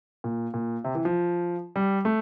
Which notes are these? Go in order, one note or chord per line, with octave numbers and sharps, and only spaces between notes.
A#2
A#2
C3
E3
F3
G3
A3